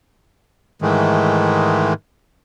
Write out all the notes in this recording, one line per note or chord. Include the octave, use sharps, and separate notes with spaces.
G#2 D#3 E3 G#3 A3